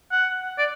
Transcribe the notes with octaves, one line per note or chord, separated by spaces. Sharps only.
F#5
D5